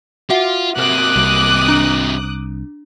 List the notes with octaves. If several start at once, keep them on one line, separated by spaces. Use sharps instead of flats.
F4 F#4 E5 F#5
C3 A#3 D6 D#6 F#6
C2
D4